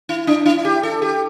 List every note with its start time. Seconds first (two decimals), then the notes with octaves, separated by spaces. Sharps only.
0.09 E4
0.27 D4
0.45 E4
0.65 G4
0.83 A4
1.02 G4